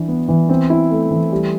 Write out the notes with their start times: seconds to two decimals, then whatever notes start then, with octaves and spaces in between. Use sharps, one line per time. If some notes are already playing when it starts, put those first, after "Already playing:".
Already playing: E3 D4
0.08 B3
0.28 E3
0.49 C4
0.70 E4
0.91 A3
1.11 E3
1.32 G3